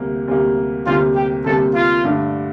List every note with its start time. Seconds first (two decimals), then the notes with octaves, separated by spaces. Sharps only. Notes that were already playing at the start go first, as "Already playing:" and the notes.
Already playing: D2 C3 G3 A#3
0.28 D2 C3 G3 A#3
0.86 D2 C3 G3 A#3 F4
1.16 G4
1.45 D2 C3 G3 A#3 A4
1.75 F4
2.04 G2 D3 A3 D4